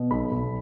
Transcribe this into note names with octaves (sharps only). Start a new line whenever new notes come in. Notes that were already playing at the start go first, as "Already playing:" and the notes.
Already playing: B2
B1 B5
B1